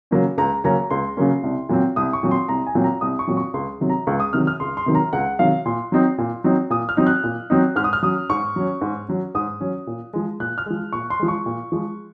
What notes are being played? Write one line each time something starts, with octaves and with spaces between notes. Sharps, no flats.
C#3 F#3 A#3 C#4
C#2 A#5
C#3 F#3 A#3 C#4 A#5
C#2 C6
C#3 F#3 A#3 C#4
C2
A#2 F#3 C4
C2 D#6
C#6
A#2 F#3 C4
C6
C2 A#5
G#5
A#2 F#3 C4
A#5
C2 D#6
C#6
A#2 F#3 C4
C#6
C#2 C6
C3 D#3 F#3
A#5
C#2 C#6
D#6
C3 D#3 F#3 F6
F6
C#2 C6
C6
C3 D#3 F#3
A#5
C#2 F#5
C3 D#3 F#3 F5
A#2 C6
F#3 C4 D#4
A#2
F#3 C4 D#4
A#2 D#6
F6
F#3 C4 D#4
F#6
A#2
F#3 C4 D#4
G#2 F6
D#6
F6
F#3 C#4 D#6
G#2 C#6
F#3 C#4
G#2
F#3 C#4
G#2 D#6
F#3 C#4
A#2
F3 G#3
A#2 F#6
F6
F3 G#3
A#2 C#6
C6
F3 G#3
C#6
A#2
F3 G#3